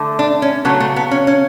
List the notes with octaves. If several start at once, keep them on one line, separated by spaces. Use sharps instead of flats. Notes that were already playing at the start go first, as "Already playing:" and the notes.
Already playing: D3 A3
D4
C#4
C#3 F#3 A3 B3
A3
B3
C#4
C#4